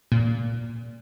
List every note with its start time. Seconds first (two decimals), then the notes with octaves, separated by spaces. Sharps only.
0.12 A#2